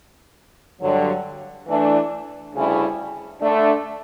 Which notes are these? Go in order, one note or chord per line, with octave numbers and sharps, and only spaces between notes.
G2 D3 F#3
E3 A3 D4
D2 C#3 G3 C#4 E4
D3 A3 D4